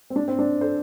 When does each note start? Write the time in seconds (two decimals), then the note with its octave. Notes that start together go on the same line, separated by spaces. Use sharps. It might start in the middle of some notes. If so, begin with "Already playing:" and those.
0.10 C4
0.16 D4
0.28 C4
0.39 D4
0.61 A4 C5